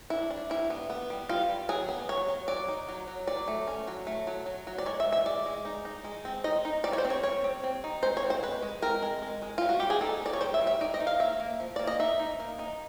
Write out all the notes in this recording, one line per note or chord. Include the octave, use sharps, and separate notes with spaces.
D4 E4
D4
G3 E4
B3
B3
G3
G3 F4
G3
F#3 G#4
B3
F#3 C#5
F#3
F#3 D5
D#4
F#3
F#3
F#3 D5
A3
C#4
F#3
A3
F#3
F#3
F#3
D5
G#3 C#5
E5
G#3
E5
G#3 D5
G#3
D#4
D#4
G#3
C4
D#4 D#5
D#4
G3 D5
C#5
C5
C4
C#5
G3 C#5
C4
C4
D#4
G#3 C5
C#5
C4
C5
G#3 B4
G#3
C4 A#4
G#3
G#3
G#3
G3 F4
F#4
G3 G4
G#4
D#4 A4
B3 D5
C#5
G3 C5
E5
G3
E5
D#4 D5
D#5
D#4
F5
A#3 E5
A#3
F3
A#3 D5
D#5
D#4 E5
D#4
A#3
D#4